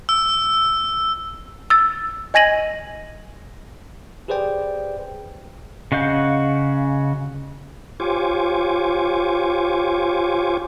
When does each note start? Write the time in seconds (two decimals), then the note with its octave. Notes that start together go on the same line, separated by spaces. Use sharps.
0.09 E6
1.70 E6 A6
2.34 D#5 G#5 G#6 A#6 D#7 F#7
4.28 G4 G#4 B4 C5 D5 G5
5.92 C#3 F#4 D#5 F5 G6
8.00 F4 G4 C5 C#5 G#5 D6